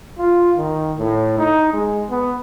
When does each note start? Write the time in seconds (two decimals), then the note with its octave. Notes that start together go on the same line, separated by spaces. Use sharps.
0.19 F4
0.57 D#3
0.98 A2
1.39 D#4
1.73 G#3
2.10 B3